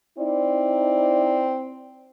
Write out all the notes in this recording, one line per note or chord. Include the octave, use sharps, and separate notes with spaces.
C4 D#4 E4 D5